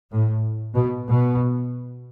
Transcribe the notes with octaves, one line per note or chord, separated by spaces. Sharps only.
A2
B2
B2